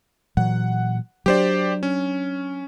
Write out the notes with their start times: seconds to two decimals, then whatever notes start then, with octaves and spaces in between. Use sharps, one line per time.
0.37 A#2 E3 F#3 F#5
1.26 F#3 C4 D4 G4 C5 D5
1.83 C#4